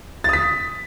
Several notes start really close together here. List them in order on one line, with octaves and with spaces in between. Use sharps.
A6 D#6 B6